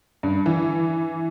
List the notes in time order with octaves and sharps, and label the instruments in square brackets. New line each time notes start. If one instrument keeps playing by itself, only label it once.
[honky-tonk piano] G2
E3